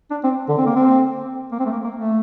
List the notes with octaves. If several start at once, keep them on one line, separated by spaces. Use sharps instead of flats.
D4
C4
D3
C4
A#3
C4
A#3
C4
A3
A#3
A#3
A3